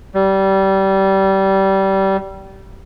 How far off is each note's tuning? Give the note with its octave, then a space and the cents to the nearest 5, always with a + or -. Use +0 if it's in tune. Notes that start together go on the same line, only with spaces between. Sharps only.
G3 -20